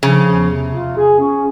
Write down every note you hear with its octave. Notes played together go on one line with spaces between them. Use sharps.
C#3 F3
E2
C3
F4
G#4
C#4